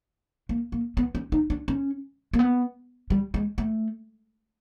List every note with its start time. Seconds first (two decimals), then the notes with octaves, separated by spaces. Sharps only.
0.49 A#3
0.72 A#3
0.97 B3
1.15 C#4
1.32 D#4
1.50 D4
1.68 C#4
2.33 A#3
2.39 B3
3.10 G3
3.34 G#3
3.58 A3